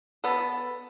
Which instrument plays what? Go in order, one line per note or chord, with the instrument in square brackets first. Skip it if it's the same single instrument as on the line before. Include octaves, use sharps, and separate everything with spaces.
[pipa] B3 A4